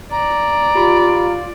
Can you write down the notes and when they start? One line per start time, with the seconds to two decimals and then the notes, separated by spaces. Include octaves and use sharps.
0.11 D5 A#5
0.75 F4 G4 B5